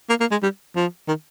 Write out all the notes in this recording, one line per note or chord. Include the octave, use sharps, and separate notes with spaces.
A#3
A#3
G#3
G3
F3
D#3